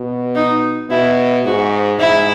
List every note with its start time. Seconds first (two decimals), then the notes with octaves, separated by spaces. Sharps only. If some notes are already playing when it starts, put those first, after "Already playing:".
Already playing: B2
0.35 D#4
0.90 B2 E4
1.45 G#2 F#4
1.99 G#2 E4